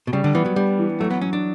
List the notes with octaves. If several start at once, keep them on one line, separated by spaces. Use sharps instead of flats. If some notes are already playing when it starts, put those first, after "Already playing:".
B2
C#3 G3
D3
E3 B3
F#3
G3 D4
E3
F#3 A3
B3
F#3 C#4
D4